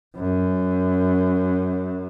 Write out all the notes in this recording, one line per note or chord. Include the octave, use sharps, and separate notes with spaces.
F#2